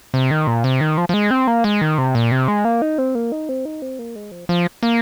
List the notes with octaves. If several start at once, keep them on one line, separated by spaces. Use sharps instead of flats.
C3
D#3
A#2
C3
D#3
F3
F3
G#3
C4
A#3
G#3
D#3
C3
A#2
C3
G#3
A#3
D#4
C4
A#3
D#4
C4
D#4
C4
A#3
G#3
F3
F3
A#3